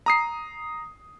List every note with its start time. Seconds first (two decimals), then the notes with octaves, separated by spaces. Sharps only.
0.06 A#5 D#6 C7